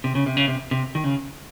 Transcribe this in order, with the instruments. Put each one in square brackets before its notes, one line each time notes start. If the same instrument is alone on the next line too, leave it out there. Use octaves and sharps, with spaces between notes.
[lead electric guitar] C3
C#3
C3
C#3
C3
C3
D#3
C#3